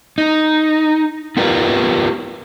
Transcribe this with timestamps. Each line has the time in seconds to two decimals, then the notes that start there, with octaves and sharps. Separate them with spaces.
0.18 D#4
1.37 B3 F4 G4 A#4 B4